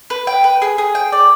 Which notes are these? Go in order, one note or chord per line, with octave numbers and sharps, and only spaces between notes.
B4
G5
B4
G#4
G#4
G5
D5